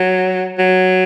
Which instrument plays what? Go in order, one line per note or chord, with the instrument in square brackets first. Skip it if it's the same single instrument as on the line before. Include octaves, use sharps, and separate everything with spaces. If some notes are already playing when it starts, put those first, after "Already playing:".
Already playing: [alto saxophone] F#3
F#3